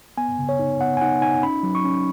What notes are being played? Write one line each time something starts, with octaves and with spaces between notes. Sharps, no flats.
B3 G#5
C#3
C#5
D#4
B3 F#5
G#5
D#4 F#5
D#4 G#5
C#4 B5
F#3
C#6
C#4